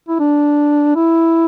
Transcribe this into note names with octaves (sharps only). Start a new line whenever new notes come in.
E4
D4
E4